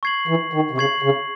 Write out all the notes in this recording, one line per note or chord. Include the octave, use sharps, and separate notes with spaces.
C#6 G#6 C7 F#7
E3
D#3
C3
C#3 C#6 G#6 C7 F#7
C#3